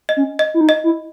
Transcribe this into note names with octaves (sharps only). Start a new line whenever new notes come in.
D#5
C#4
D#5
E4
D#4
D#5
E4